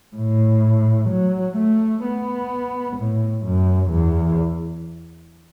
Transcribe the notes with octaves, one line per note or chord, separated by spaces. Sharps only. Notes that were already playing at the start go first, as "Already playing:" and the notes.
A2
F#3
A3
B3
A2
F#2
E2